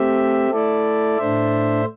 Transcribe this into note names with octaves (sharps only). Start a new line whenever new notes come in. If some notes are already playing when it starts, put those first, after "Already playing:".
Already playing: A3 C4 G4 E5
A3 E4 A4 D5
A2 A3 D4 C5 E5